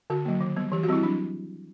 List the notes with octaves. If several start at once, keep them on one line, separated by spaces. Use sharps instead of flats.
D3 F#4
F#3 A#3
D#3
G3 B3
E3 G4
F#4
G3 C4 E4
F#3 D4